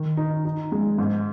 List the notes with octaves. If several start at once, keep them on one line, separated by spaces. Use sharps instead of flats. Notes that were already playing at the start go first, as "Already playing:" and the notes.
Already playing: D#3
D#4
D#4
G#3
G#2